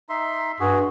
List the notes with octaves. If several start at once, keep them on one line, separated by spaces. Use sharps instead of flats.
D#4 E5 C6
G2 F#4 G#4